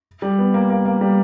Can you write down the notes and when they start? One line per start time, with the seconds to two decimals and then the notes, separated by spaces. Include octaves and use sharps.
0.22 G3
0.39 B3
0.54 A#3
0.70 A#3
0.85 A#3
1.01 G3